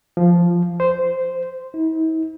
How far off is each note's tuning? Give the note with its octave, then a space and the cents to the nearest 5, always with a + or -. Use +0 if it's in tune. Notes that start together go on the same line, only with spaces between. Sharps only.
F3 -5
C5 -10
E4 -45